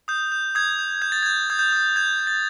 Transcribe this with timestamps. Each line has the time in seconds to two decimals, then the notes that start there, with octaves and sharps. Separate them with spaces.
0.08 D#6 G6
0.32 G6
0.55 D#6 G#6
0.79 G6
1.02 G6 G#6
1.12 A6
1.23 G6 G#6
1.50 D#6 G#6
1.59 G6
1.72 D#6 G6
1.96 G6 G#6
2.20 G6
2.27 A6